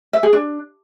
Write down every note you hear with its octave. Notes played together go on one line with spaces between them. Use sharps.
E5
G#4
D4